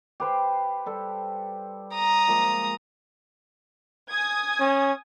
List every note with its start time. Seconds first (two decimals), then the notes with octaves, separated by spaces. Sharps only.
0.20 G4 B4 C5
0.86 G3 A4 G5
1.95 A#5 D#6
2.28 F3 G#3 A#3
4.11 G#5 D#6 G#6
4.60 C#4